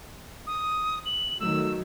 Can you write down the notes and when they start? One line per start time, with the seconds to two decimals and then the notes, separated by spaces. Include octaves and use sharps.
0.47 D#6
1.06 F#7
1.40 D#3 F#3 A3 E6